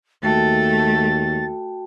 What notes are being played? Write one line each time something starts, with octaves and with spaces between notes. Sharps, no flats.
D#2 A3 F#4 G5 A5 A6